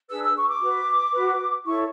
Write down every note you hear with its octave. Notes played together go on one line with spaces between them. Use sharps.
D4 G#4 B4 E6
E6
C#6
D6
F#4 B4
F#4 B4
E4 A4 C#5 C#6